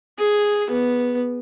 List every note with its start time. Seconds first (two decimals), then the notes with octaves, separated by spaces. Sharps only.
0.19 G#4
0.70 B3